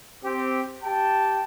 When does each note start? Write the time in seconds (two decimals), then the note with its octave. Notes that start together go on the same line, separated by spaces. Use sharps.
0.24 C4 G4
0.84 G4 G5 A5